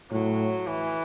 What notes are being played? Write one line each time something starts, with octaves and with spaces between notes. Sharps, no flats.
A2 F#3
E3